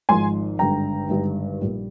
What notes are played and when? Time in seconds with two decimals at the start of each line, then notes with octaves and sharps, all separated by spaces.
0.09 G#1 G#2 F3 G#5 C6
0.59 G#1 G2 D3 G5 A#5
1.09 G#1 G2 D3
1.61 A#1 A#2 G3